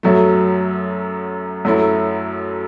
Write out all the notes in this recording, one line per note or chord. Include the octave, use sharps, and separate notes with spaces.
F#2 F#3 A3
F#2 F#3 A3 E4